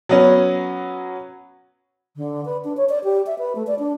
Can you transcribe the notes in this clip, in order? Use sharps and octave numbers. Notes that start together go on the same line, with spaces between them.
F#3 B3 C#4
D3
B4
D4
C#5
D5
G4
E5
B4
A3
D5
D4